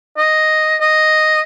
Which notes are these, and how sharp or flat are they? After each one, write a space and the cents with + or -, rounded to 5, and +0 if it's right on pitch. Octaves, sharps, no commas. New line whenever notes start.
D#5 +0
D#5 +0